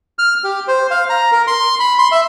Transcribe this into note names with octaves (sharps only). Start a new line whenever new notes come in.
F6
G4
C5
F5
A#5
A#4
C6
B5
C6
E5